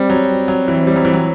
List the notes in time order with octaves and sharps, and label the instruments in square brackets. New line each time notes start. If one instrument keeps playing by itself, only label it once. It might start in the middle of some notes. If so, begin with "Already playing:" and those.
Already playing: [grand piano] G3 [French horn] C4
[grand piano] F#3
F#3
E3
G3
F#3
E3
F#3